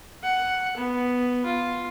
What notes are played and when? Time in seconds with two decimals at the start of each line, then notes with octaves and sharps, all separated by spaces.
0.23 F#5
0.77 B3
1.45 F4